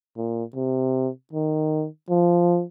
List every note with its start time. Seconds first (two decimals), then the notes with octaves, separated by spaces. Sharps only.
0.17 A#2
0.55 C3
1.33 D#3
2.10 F3